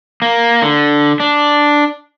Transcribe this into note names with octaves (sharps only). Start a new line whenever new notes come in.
A#3
D3
D4